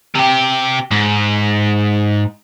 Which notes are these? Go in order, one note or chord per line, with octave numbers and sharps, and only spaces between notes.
C3 G4
G#2